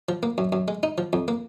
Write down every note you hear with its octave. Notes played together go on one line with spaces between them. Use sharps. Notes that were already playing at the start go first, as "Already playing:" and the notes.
F3
A#3
F#2
F#2
G#3
D#4
F3
F2
A#3